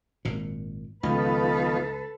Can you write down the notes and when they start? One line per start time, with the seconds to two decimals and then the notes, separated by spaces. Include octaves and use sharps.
0.25 G#1 A#2
1.03 C#2 D#3 F3 B3 A4 B4